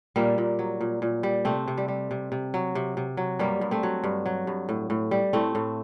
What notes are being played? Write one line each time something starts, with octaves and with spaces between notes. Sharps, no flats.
A#2 G3 A#3
A#2
F#3
A#2
A#2
G3
C3 A3 C4
C3
G3
G3
C3
C3
F#3
C3
C3
F#3
G2 G3 A#3
G2
A3 C4
F#3
G2
F#3
G2
A2
A2
G3
A2 A3 C4
A2